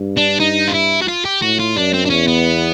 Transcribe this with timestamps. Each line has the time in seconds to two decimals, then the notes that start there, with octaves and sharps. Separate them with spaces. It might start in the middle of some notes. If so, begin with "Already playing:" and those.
Already playing: G2
0.17 D4
0.39 D#4
0.68 F4
0.74 E4
1.02 F#4
1.08 F4
1.25 G4
1.42 A2 F#4
1.59 F4
1.76 F#2 D4
1.94 C4
2.06 D4
2.10 E2 C#4
2.27 B3